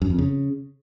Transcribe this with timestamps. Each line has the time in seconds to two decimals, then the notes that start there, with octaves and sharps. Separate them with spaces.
0.02 F#2
0.10 F2
0.19 C#3